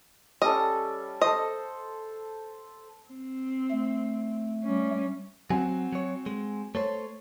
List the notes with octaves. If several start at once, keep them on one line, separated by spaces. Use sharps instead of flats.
G3 C#4 A4 D#5
A4 C5 D#5
C4
A3
G3 C#4
F#3 C4 F#4 G#5
F#3 C#5
G#3
A3 A4 C5 C#5